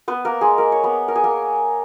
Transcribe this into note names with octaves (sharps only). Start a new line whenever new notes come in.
B3 B4
A#3 A#4
G#3 G#4
A#3 A#4
C#5
B3 B4
A#4
G#4
A#3 A#4